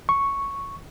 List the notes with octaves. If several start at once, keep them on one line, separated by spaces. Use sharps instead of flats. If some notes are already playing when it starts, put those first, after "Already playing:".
C#6